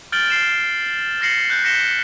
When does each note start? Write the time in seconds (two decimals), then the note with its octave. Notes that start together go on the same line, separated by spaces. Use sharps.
0.12 F6 G6 A6 D7 F#7 G7
0.30 F6 C7 E7
1.21 F6 A#6 C7 C#7 F#7
1.50 F#6 G6
1.64 A#6 B6 C#7 E7 G7